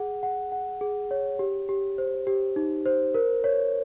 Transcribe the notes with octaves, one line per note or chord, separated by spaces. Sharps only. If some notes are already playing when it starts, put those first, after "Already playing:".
Already playing: G#4 F#5
F#5
F#5
G#4
C#5
G4
G4
C5
G4
D#4
C5
A#4
C#5